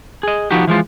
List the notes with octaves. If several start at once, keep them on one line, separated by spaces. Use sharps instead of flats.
G#4 D#5
F3 B3 D#4 F#4 G4
E3 F3 G#3 F4